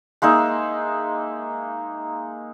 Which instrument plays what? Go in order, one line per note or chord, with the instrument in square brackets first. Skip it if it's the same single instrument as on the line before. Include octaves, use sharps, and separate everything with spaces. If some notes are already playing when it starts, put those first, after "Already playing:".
[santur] G#3 A#3 D#4 E5